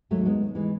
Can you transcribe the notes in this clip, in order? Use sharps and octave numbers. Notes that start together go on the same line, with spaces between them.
D#2 F#3 A3
G#3 B3
D#2
E3 G#3